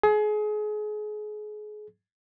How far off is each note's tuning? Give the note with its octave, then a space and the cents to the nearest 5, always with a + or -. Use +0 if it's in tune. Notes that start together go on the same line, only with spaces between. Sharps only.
G#4 +30